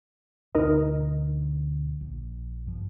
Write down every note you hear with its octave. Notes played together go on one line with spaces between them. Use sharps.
D2 B2 D3 D#4 A#4 D#5
A#1
G2 F3